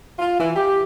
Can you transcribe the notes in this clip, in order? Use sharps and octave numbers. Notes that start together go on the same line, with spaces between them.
F4
E3
G4